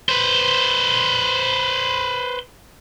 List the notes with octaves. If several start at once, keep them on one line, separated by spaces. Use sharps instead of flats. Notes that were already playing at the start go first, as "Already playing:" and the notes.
B4 C5